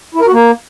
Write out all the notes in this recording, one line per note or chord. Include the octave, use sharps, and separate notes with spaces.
E4
A#4
F#4
A#3